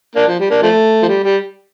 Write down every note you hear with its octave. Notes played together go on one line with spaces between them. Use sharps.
A#3 D4
F3
G3
A#3 D4
F3 A3
F3
G3
G3